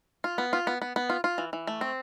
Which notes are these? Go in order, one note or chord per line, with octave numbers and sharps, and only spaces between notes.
F4
B3
F4
B3
B3
B3
F4
F4
E3
E3
A3
C4